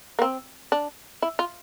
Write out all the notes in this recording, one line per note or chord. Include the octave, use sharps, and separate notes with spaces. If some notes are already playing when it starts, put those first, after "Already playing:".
A#3
C4
D4
E4
F4